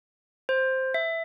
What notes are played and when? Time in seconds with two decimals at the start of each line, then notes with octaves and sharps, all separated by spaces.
0.49 C5
0.94 E5